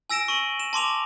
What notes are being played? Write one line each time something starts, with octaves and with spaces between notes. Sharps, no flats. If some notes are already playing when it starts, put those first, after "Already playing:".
G#5 E6 A#6 D7 E7
C#6 D#7 F#7
E7
A5 C6 D6 F7